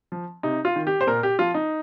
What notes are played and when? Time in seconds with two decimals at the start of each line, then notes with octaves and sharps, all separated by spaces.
0.12 F3
0.43 C3 D#4
0.65 F4
0.76 D#3
0.87 G4
1.01 C5
1.07 A#2 A#4
1.23 G4
1.39 F3 F4
1.54 D#4